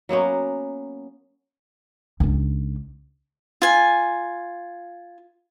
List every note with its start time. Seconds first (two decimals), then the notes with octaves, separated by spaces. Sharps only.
0.09 F#3 A#3 B3 C#4
2.20 C#2 D4
3.62 F4 G#5